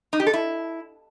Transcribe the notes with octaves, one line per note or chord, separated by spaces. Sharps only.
D#4
G4
A4
E4